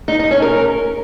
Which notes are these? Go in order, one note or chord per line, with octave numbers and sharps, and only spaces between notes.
D#4
D#4
C#4
A#4